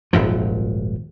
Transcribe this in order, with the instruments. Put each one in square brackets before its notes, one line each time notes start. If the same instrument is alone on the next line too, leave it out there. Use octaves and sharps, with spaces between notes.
[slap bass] D#1 G#1 F#2 F3